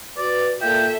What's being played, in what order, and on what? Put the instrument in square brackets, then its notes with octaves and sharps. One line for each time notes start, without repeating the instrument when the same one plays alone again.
[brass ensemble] F#4 B4 [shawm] D5
[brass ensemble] A#2 [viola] A4 E5 [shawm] G5